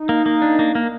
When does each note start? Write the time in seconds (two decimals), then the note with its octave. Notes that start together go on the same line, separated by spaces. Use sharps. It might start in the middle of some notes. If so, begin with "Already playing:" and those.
Already playing: D#4
0.09 A#3
0.26 A#3
0.42 D4
0.59 A#3
0.75 A#3